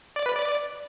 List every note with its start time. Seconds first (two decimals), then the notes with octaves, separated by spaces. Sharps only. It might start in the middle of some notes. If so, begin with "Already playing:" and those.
0.16 D5
0.26 B4
0.36 D5